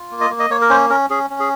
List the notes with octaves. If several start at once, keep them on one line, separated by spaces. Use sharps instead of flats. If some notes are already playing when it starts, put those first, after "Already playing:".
Already playing: F4
A#3
D#5
A#3
D#5
A#3 C#5
A#4
C#4 C5
C#4 A#4
C#4 G#4
C#4
G#4